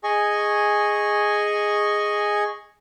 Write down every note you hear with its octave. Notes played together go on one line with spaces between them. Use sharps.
G#4 D#5 G#5 C#6